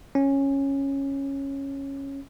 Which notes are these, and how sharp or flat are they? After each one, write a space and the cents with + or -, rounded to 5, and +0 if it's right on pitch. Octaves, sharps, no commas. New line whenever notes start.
C#4 -10